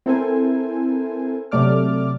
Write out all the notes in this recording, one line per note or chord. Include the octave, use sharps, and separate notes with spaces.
C4 E4 A4 A#4 C5 G#5
C3 F#3 A3 D5 D6 F6